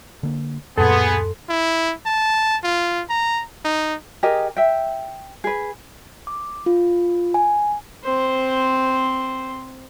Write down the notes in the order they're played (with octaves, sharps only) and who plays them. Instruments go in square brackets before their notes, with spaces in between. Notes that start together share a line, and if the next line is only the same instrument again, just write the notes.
[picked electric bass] D3 A#3
[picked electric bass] D1 A#2 [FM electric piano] F#2 C6 [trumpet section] B3 G#4 [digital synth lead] A4
[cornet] E4
A5
F4
A#5
D#4
[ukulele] G4 G#4 A#4 D#5
E5 G5
G#4 B4
[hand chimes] D6
F4
G#5
[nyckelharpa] C4 C5